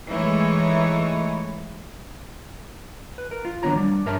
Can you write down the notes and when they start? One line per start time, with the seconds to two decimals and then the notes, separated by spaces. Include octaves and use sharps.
0.10 E3 G#3 A3 D#4 C#5
3.18 B4
3.31 A#4
3.45 F4
3.63 D#3 F#3 B3 D4 C#5 A#5
3.76 G3 D4
4.06 G2 G3 A#4 C#5 E5 A5